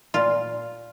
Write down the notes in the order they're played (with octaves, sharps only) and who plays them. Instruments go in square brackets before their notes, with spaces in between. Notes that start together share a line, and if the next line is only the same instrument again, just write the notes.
[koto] A#2 F4